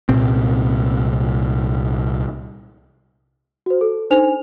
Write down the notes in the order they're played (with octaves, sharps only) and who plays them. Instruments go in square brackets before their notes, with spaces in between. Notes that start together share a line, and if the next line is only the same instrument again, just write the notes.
[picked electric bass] C2 A#2 C4
[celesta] F#4 C5
A4
D4 D#4 C5 G#5 F7